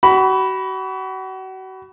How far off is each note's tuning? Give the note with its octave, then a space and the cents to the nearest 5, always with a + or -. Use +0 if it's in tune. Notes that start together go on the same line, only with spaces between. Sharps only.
F#4 +35 B5 +0